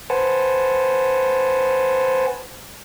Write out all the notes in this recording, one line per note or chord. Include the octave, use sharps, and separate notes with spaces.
B4 C5 F#5 G#5 A5